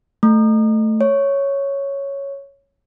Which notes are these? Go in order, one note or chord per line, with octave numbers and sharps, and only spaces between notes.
A3
C#5